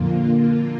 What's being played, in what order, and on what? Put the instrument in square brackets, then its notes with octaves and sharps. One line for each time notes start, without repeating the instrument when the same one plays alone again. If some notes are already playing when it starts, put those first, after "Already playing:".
Already playing: [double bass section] F2 A#2 [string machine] D3 A#3 F4